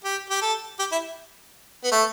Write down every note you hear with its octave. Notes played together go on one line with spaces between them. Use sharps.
G4
G4
A4
G4
E4
B3
A3